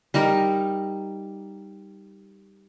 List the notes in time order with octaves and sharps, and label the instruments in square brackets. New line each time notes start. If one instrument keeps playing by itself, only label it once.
[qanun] G3 D#4 A#4